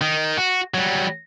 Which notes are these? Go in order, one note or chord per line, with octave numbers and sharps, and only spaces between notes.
D#3
F#4
F#3 G3